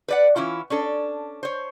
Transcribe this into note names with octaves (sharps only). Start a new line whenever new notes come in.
B4 D5 F#5
E3 C#4 E4 F4
C#4 D4 A4
C5 C#5